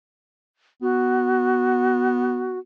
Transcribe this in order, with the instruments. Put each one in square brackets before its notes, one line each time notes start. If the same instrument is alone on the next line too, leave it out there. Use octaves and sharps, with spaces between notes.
[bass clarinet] B3 [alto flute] F#4